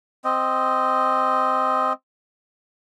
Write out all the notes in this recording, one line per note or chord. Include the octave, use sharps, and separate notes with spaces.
C4 D#5